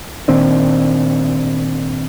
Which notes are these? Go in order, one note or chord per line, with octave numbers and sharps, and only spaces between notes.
A#2 D#3 C4 D4